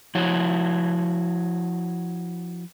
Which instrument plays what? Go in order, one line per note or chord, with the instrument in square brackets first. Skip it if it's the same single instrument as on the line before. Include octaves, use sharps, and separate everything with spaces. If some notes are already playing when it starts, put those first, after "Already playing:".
[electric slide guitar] F3 E4 F#4 C#5